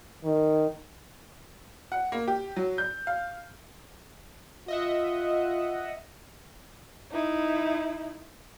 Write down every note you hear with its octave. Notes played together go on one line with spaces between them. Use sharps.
D#3
F#5
A#3
G4
F#3
G6
F5
F4 D#5 E5 F#5
D#4 E4